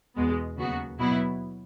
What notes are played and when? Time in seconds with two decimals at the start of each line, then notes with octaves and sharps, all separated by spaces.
0.16 E2 B2 G#3 B3
0.57 D#2 C#3 F#3 B3 F#4
0.99 B2 F#3 B3 E4